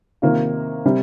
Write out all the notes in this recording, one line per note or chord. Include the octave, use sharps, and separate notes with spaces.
C3 D#3 A#3 F4 A#4
C3 G3